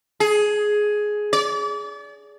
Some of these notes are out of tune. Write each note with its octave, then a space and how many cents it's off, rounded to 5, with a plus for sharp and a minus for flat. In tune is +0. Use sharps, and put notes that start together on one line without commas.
G#4 +10
D5 -35